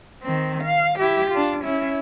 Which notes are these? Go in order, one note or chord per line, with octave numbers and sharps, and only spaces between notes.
D#3 C4
F5
E4 G4
D4 F4
C#4 E4